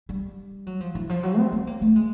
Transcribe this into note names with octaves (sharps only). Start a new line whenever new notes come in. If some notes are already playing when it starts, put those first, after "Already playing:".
G3
F#3
F3
E3
F3
F#3
C4
C4
A#3
A3
G#3